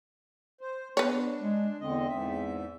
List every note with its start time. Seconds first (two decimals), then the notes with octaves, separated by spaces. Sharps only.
0.61 C5
0.97 B3 D4 B4 C#5
1.39 G#3
1.80 E2 D3 C4 D#5
2.08 E2 G#2 E5